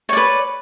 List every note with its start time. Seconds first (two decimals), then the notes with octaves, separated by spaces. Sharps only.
0.09 C#5
0.13 D5
0.17 B4